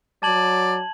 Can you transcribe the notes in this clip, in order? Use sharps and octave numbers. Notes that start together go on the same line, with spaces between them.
F#3 D5 A5 G#6 F#7